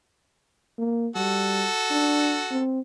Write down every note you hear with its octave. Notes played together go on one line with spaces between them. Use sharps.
A#3
G3 F#4 A4
D4
C4